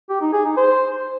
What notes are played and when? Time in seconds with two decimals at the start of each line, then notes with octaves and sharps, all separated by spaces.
0.10 G4
0.21 D#4
0.33 G#4
0.45 D#4
0.57 C5